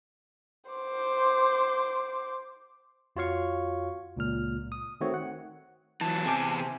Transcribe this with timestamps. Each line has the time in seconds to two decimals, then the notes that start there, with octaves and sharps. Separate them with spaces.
0.70 C5 D6
3.16 F2 F4 F#4 C#5 F5 C#6
4.17 C#2 A#2 F6
4.72 D#6
5.01 D#3 A3 C4 F#4 C#5
5.14 F#5
6.01 E2 E3 F#3 A5
6.26 C3 G#4 G#5 D6